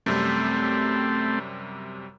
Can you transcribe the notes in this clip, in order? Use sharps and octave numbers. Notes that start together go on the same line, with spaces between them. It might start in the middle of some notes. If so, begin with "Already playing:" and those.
F#2 C3 G3 A3 C4